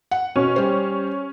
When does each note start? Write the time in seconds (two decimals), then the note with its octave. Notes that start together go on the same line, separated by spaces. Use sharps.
0.11 F#5
0.36 B2 C#4
0.56 G3 C5